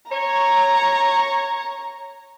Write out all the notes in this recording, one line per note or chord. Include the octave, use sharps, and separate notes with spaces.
C#5 A#5